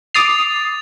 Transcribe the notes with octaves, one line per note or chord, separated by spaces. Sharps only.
D6 D#6 A6 C7 F7